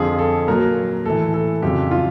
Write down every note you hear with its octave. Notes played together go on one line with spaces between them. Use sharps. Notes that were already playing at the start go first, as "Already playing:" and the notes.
Already playing: F2 D3 F3 G#4
A4
A#2 F#3 A#4
A2 E3 A4
A4
F2 C#3 F#3 G4
F4